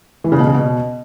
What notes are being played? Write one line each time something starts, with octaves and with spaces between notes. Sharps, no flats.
E3
C#3
B2
C#3
B2